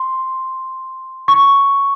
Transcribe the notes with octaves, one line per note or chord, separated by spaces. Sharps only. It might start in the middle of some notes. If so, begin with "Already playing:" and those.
Already playing: C6
C#6